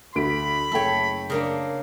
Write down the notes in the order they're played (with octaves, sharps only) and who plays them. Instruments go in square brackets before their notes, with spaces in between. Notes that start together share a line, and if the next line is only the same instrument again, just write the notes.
[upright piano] D2 D7 [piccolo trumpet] B5
[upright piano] F#1 A3 G5 [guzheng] A4 C#5
[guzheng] C#3 A#3 D4